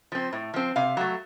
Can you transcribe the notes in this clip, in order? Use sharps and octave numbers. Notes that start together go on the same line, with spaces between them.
F3 C4
A2
F3 C4
C3 F5
F#3 A3